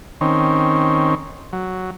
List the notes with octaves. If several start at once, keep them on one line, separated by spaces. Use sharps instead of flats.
D#3 C4 C#4
F#3